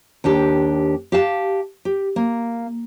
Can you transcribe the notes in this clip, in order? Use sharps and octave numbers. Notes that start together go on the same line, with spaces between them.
D#2 D4 G4
G4 F5 A5
G4
A#3